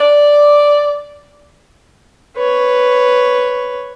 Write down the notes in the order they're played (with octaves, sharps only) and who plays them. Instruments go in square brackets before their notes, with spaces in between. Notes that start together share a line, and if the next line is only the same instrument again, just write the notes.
[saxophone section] D5
[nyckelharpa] B4 C#5